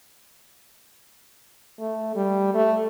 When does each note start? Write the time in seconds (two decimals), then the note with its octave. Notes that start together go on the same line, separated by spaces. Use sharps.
1.80 A3
2.16 G3
2.55 A3